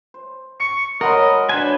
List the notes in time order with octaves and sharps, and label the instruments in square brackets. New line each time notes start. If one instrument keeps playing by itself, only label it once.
[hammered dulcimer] C5
[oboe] C#6 [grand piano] C#7
[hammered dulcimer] F#3 G#3 [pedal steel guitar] A#4 [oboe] D#5 [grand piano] F#5 B5 C6
[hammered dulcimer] F#2 [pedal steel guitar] D4 C5 G#5 [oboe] B4